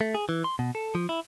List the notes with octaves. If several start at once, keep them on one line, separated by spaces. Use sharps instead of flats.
A3
G#4
E3
C6
B2
A4
F3
E4